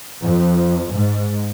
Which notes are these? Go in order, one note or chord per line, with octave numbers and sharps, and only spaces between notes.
F2
G#2